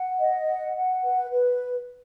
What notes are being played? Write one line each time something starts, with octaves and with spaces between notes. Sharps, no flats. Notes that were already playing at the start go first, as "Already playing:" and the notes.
Already playing: F#5
D#5
F#5
F#5
B4
B4